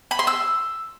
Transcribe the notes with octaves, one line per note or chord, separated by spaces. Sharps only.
B5
C6
E6